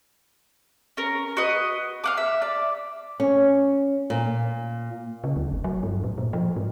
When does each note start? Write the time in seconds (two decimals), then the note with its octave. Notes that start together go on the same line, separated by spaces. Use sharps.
0.97 C#4 A#4
1.37 F#4 B4 D#5
2.04 F5 F#5 D6
2.17 E5
2.42 D5 D6
3.20 C#4
4.10 A#2
5.24 C#3
5.36 D2
5.51 G1
5.64 F#3
5.83 G2
6.04 A2
6.18 A#2
6.33 F3
6.57 G#2